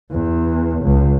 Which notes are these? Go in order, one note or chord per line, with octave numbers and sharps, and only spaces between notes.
E2
C#2